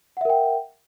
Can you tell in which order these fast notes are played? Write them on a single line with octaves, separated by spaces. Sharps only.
F#5 E5 A#4 G5